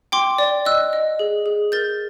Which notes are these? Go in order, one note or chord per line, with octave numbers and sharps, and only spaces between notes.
G5 C6 D6
D5
D#5 E6 F#6
D#5
G#4
G#4
A#4 G6 A6